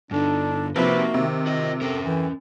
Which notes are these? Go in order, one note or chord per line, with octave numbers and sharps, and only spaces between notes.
G2 D3 D4 D#4 A4
C3 F3 A#3 D#4 F#4 B4 E5
C3 D#3
F4 F#4 A#4 D#5
C#4 A4 A#4 G5
E3 A4 G5 G#5